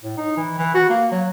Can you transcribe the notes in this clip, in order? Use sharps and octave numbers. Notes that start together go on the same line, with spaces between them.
A2
D#4
E3
E3
F#4
A#3
F#3